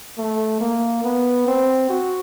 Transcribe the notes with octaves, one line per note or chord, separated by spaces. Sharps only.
A3
A#3
B3
C4
F#4